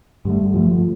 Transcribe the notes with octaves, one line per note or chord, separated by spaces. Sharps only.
G2 D3 G3 A3
G2 D3 F3 A3